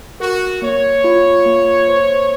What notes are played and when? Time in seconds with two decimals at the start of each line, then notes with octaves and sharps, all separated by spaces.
0.20 F#4 A#4
0.62 A#3 C#5
1.04 F4
1.46 A#3
1.88 C5